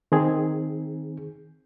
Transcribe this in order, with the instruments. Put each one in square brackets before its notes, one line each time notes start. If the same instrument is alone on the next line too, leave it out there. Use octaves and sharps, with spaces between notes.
[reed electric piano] D#3 C4 G#4